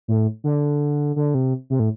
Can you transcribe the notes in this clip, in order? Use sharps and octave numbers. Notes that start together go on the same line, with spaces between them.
A2
D3
D3
C3
C3
A2